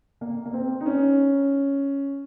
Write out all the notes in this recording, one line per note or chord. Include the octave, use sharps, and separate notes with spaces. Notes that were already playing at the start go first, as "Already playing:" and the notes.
A#3
A#3
C4
D#4
C#4